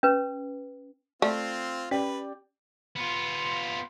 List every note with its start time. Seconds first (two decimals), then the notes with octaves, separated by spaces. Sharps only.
0.03 C#4 B4
1.22 A3 C4 F4 D5
1.91 C#4 G4 B4 D5 G5
2.96 B3 F4